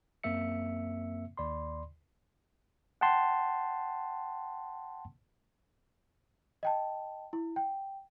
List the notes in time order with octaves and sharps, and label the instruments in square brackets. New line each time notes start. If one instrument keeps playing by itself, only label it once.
[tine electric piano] F#2 A#3 C4 E5 C#7
D#2 D5 B5 C6
F#5 G5 A5 C6
[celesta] D#5 G5 A5
E4
G5